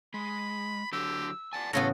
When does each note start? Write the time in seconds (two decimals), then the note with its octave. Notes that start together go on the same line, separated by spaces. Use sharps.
0.14 G#3 B5
0.92 D3 F#3 G4 E6
1.53 D5 F#5 G#5 A5
1.73 A2 C#3 E3 F#3 B3 A4 A5 A#6